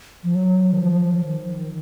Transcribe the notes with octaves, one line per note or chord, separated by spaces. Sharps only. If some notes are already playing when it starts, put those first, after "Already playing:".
F3
F#3
D#3
F3
D#3